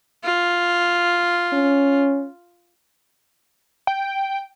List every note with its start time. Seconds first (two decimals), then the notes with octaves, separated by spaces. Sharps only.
0.24 F4
1.53 C#4
3.87 G5